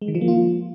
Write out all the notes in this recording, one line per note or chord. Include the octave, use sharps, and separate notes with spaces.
G#3
D#3
F3
A#3
F4